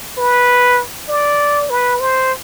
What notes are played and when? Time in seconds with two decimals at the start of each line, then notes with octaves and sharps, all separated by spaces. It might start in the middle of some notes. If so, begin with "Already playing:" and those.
0.18 B4
1.09 D5
1.70 B4
2.00 C5